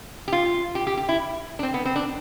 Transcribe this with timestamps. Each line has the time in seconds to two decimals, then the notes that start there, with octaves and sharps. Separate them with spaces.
0.28 G4
0.33 F4
0.75 G4
0.87 G4
0.97 G4
1.09 E4
1.59 D4
1.63 C4
1.74 B3
1.85 C4
1.96 D4